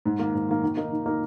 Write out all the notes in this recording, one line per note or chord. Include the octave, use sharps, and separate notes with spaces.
G#2
D#3 A#3
G#2
D#3 A#3
D#3
A#3 D#4 A#4
D#3
A#3 D#4 A#4